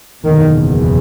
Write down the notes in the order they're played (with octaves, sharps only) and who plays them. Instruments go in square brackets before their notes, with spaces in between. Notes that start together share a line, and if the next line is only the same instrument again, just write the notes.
[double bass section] F#1 E2 B2 D#3